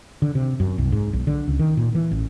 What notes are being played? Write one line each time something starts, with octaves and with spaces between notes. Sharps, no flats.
D3
C3
F#2
C2
G#2
B1
D3
C#2
D#3
A#2
E3
A1